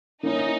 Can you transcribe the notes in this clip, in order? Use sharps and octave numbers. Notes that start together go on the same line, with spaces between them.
A#3 C#4 D#4 E4